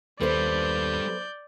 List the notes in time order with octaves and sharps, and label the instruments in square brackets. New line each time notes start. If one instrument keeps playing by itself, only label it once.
[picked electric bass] D#2 [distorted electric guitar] G3 B4 [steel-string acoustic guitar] B3 A4 C5 [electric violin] D5 G6